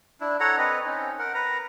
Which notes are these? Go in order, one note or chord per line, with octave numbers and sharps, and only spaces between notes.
D4 E4
A4 C#5 F#5 A#5
C4 B4 D#5
C4 C#4 D#4
A#4 F#5
B4 A#5